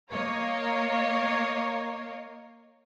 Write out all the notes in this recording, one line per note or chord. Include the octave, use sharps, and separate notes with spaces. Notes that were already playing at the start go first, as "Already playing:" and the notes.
A#3 A#4 C#5 D#5 F5